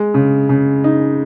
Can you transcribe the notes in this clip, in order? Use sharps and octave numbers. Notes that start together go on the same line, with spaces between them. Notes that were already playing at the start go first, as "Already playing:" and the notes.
Already playing: G#3
C#3
C#3
D#4